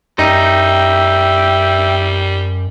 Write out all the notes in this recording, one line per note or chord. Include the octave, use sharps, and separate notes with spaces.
F#2 G3 D#4 E5 G5